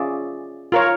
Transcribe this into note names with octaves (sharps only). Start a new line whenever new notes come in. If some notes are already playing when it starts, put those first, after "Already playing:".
Already playing: C#4 F4 G#4 D5 E5
F4 A#4 C#5